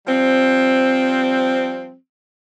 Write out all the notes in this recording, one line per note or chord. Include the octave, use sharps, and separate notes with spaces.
F3 G3 C4